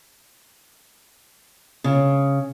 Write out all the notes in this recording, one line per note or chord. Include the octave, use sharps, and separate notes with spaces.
C#3